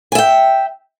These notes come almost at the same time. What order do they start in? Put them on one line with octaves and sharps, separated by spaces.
G#5 E5 G5